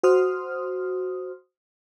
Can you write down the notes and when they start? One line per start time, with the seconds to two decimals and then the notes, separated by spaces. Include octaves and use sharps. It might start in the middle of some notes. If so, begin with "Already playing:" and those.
0.03 F#4 C5 C6 D#6 F6